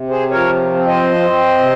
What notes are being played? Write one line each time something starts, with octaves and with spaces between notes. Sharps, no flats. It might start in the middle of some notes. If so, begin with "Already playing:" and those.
Already playing: C3
G#4 C5
F3 A#4 C#5
C4
C5 D#5
C4
C3